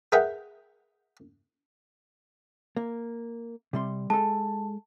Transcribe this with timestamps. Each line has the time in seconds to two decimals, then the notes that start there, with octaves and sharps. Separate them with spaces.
0.12 G#4 A#4 B4 E5 F#5 G5
2.77 A#3
3.73 C3 G3 C6
4.10 G#3 A4 A5